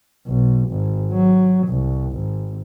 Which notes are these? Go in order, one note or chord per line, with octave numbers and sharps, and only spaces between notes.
B1
G#1
F#3
C2
G#1